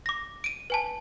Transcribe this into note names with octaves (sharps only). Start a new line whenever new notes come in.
D6 A#6
D7 D#7
B4 G#5 A5